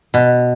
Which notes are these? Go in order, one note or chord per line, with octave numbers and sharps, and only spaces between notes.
B2